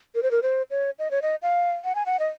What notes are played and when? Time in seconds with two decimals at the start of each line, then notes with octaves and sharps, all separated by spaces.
0.15 A#4
0.23 C5
0.31 A#4
0.43 C5
0.71 C#5
0.99 D#5
1.11 C#5
1.22 D#5
1.42 F5
1.84 F#5
1.95 G#5
2.06 F#5
2.20 D#5